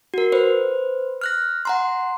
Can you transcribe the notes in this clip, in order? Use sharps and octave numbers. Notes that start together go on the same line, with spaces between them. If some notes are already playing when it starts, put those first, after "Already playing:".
F#4 A#4
B4 C5
F6 F#6 A#6
F#5 A#5 C6